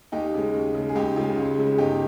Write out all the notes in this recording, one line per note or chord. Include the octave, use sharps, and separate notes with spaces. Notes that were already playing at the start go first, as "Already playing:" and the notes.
D#2 D#4 G4
C#3 G#3
D#2
C#3 G#3
G#4
C#2 D#4 G4
C#3 G#3 F4
C#2
C#3 G#3
G1 D#4 G4